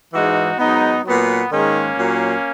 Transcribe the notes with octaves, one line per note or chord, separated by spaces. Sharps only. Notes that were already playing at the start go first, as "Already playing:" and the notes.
G#2 E3 G#3 D#4 F#4
G#2 F#3 B3 D#4
A#2 F#3 B3
G#2 D#3 G#3 A#3 C#4
A#2 F#3